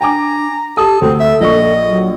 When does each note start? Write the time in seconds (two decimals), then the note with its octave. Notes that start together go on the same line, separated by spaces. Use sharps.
0.01 D4 G5 G#5 A#5 D6
0.77 G4 A4 A5 D#6
1.01 D2 C4 A4
1.20 E5
1.41 A#1 D#5 C#6
1.88 F#3